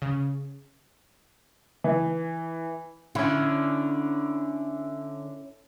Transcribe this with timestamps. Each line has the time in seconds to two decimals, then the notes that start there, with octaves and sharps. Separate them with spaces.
0.02 C#3
1.84 E3
3.15 D3 C#4 E4